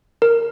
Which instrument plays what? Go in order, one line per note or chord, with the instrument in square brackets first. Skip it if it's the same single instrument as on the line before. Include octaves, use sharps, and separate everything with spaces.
[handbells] A#4